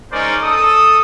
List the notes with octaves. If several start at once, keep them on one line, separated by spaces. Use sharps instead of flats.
G#3 C#4 D#4 A#4 C5 D5
A4 D#6